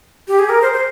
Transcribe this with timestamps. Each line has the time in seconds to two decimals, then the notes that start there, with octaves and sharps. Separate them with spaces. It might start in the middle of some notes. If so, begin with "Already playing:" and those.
0.28 G4
0.39 G#4
0.49 A#4
0.62 C5
0.73 C5